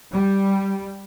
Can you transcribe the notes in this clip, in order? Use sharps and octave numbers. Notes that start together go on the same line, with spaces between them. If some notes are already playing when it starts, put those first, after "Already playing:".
G3